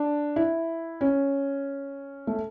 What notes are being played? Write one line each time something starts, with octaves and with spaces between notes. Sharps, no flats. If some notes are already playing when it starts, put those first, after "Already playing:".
Already playing: D4
E4
C#4
A3